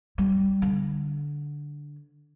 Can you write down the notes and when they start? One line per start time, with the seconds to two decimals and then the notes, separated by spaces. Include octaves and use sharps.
0.18 G3
0.62 D3